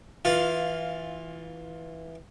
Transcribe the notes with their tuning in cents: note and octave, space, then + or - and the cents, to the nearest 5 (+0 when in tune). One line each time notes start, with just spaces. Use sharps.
E3 -10 F4 +10 F5 +0